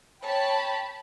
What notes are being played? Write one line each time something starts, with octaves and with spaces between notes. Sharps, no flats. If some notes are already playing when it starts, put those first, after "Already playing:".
C#5 G5 A5 B5